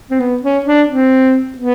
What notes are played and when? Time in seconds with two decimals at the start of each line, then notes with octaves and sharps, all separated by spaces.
0.11 C4
0.20 B3
0.43 C#4
0.66 D4
0.88 C4
1.58 B3